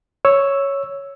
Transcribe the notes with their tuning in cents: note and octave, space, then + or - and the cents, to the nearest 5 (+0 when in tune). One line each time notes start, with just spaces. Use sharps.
C#5 +0 E6 +0